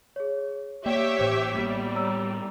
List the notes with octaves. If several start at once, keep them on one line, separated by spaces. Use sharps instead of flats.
G#4 C#5
A#3 G4 C#5 D5 E5 G5
A1 A2 C5
A2 G3 A#3 B3 B6
C#5 A#5 E6